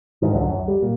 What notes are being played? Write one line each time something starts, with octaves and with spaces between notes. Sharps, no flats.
D2 G#2 D#3
C#2 D3 F#3
F#2
G3
A#2